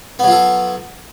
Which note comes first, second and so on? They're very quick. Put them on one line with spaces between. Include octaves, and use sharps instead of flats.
B3 F#3 F4 A4